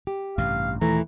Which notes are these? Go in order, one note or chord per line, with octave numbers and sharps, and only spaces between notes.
G4
A1 G2 C3 F5
D#2 A#2 E3 A3 A#5